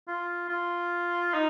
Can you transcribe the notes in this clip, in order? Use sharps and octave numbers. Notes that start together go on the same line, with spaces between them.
F4
F4
D#4